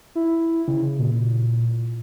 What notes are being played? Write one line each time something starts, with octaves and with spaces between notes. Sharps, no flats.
E4
C#3
A#2